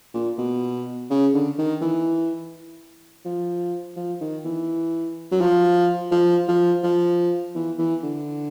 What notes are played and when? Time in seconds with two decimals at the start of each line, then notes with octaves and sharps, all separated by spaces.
0.14 A#2
0.38 B2
1.10 C#3
1.34 D3
1.58 D#3
1.81 E3
3.25 F3
3.96 F3
4.21 D#3
4.45 E3
5.31 F#3
5.41 F3
6.11 F3
6.48 F3
6.83 F3
7.55 E3
7.79 E3
8.03 D3